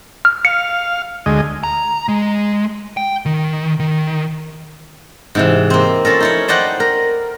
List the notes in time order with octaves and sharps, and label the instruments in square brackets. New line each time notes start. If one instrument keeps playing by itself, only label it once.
[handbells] F6
[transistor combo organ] F5 [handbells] C#7
[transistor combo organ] D2 G#3 D#5
[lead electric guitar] A#5
G#3
G5
D#3
D#3
[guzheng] G#2 C3 E3
A#3 C4
F3 C#4 A4 A#4
D#4 E4 C#5
C5 D5 D#5 F#5 G5
A#4